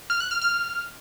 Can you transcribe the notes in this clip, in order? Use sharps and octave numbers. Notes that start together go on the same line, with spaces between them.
F6
F#6
F6
F6